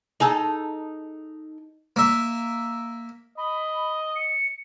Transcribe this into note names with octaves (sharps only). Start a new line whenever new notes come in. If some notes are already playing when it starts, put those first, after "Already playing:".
D#4 G#4 A4
A#3 E5
D#5 B5
C#7